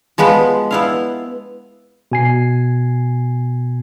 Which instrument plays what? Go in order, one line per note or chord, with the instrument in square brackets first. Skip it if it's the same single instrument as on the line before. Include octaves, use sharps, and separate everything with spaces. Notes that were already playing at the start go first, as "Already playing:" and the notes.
[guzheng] F3 G#3 B3 B4
B3 E4 F5
[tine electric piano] B2 G#5 C7